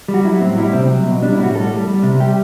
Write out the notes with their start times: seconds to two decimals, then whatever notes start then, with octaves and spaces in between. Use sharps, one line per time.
0.08 G3
0.14 F#4
0.25 F#3 E4
0.41 A2 C4
0.57 G3 E4
0.73 C3 C4
0.90 F#3
1.06 B2
1.22 G3 D4
1.33 E4
1.38 A2
1.44 F#4
1.55 G3 A4
1.71 G3
1.87 G3
2.03 C3
2.20 G3 G4